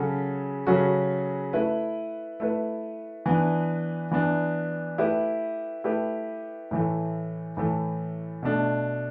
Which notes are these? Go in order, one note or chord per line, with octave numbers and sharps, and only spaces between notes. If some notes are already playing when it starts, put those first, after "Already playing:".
Already playing: C#3 F#3 C#4 F#4 A4
C#3 F#3 C#4 F#4 A4
A3 E4 B4
A3 E4 B4
E3 B3 D4
E3 B3 D4
A3 E4 G4 B4
A3 E4 G4 B4
A2 E3 A3
A2 E3 A3
B2 A3 D4